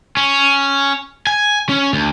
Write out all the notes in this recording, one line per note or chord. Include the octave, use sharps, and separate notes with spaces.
C#4
G#5
C#4
D2